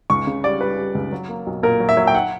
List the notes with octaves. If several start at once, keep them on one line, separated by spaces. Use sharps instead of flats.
C#2 C#6
C#3
G3 D5
G3 B4
G3
C#2
F#3
A#3
B1
A#2 A#4
F#3
E5
F#3
G5
F#5